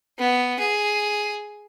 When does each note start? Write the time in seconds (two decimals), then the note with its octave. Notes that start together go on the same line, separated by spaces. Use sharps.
0.19 B3
0.60 G#4